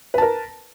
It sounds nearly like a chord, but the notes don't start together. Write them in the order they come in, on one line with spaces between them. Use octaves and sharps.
B4 A5 A#4